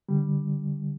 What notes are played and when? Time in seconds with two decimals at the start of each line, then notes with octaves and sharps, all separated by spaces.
0.09 D3 G3